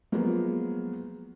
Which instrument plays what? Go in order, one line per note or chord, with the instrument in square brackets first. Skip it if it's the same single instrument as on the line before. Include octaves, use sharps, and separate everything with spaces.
[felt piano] F3 F#3 G#3 A#3 B3